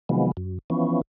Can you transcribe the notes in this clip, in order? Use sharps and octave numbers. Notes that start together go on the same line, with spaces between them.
C3 D#3 F3 F#3 G#3 B3
F#2
E3 F3 B3 C#4